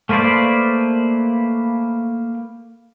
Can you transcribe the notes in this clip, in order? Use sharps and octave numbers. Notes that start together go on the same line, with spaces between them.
A3 A#3 B4 C5 D5